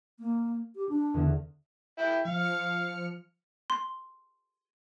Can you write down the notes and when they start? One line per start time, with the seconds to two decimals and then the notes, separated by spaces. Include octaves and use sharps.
0.19 A#3
0.76 G4
0.89 D4
1.14 E2 D3
1.98 E4 G5
2.25 F3 F5 F6 C#7
3.70 C6